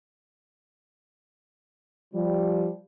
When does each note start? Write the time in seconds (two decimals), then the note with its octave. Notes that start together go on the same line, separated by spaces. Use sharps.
2.14 F3 G3